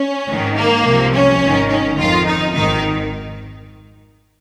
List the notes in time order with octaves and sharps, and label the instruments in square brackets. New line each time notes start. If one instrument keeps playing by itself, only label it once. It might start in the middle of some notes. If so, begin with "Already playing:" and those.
Already playing: [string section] C#4
G#1 G#2 D#3
A#3
C2 C3 F3
C#4
G#1 G#2 D#3
C#4
F2 D#3 F4
D#4
G#1 G#2 D#3 D#4